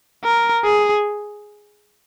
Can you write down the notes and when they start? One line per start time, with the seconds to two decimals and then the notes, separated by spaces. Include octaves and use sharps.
0.24 A#4
0.64 G#4